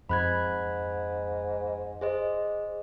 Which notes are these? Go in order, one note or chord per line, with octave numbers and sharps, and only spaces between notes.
F2 G#2 B5 F#6 G#6
G#4 C5 D#5